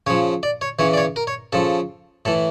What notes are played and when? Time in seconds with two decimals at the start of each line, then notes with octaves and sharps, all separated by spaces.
0.07 C#3 F3 C#5
0.43 D5
0.61 C#5
0.79 C#3 E3 C#5
0.93 D5
0.97 C#5
1.16 A#4
1.27 C#5
1.53 C#3 F3 A4
2.25 A2 E3 A4